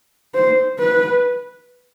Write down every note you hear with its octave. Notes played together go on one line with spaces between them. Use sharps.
C5
B4